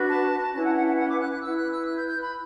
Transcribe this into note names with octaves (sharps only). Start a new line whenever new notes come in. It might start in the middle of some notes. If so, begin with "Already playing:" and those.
Already playing: D4 F#4 B4
A5
C#4 E4 B4 A5
F#5
F#5
F#5
F#5
D6
F#6
F#6
E4 B4 E6
F#6
E6
F#6
G6
G6
B5